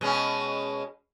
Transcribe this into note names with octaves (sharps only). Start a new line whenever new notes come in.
B2 G#3 C#4